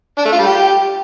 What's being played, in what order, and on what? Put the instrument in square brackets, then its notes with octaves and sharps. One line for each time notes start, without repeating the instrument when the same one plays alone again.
[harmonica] D4
A3
F4
G3
G4